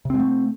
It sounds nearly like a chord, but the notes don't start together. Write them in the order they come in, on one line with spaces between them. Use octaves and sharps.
C3 C4 G#3 A3